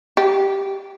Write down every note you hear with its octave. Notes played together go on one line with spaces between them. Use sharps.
G4